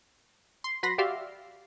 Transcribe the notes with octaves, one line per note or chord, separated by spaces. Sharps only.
C6
F#3 B4 B5 C6 A#6
F#4 G4 D5 E5 F5 C6